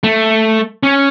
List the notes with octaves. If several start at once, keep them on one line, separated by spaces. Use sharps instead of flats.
A3
C#4